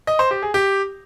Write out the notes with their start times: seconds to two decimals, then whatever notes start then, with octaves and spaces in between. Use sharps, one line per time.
0.07 D#5
0.19 C5
0.31 G4
0.42 G#4
0.54 G4